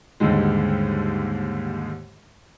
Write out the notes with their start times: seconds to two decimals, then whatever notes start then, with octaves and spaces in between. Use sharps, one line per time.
0.20 D#2 G#2 D3 G3 G#3